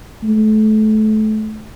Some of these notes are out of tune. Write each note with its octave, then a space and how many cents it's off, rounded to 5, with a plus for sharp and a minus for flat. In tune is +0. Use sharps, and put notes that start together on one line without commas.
A3 -30